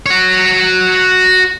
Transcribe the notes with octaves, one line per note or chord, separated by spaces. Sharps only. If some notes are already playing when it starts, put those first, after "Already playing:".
F#4 C#5